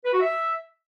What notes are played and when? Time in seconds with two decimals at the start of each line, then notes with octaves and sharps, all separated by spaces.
0.05 B4
0.12 F#4
0.20 E5